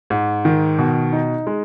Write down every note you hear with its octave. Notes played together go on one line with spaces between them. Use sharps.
G#2
D#3
B2
D#4
G#3